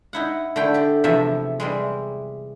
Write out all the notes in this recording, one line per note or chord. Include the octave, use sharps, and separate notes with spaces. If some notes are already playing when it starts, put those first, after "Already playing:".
D#4 E4 F#5
D3 A3 E4 G5
G4 D5
E2 C3 F3 A4 E5
E3 G3 G#3